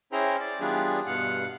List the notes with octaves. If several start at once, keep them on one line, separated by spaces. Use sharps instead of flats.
C#4 E4 G#4 C5 G5 A#5
D5
E3 G3 B3 D4 F4 G#4
G2 B2 F5 F#5